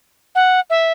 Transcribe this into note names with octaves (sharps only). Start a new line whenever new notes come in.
F#5
E5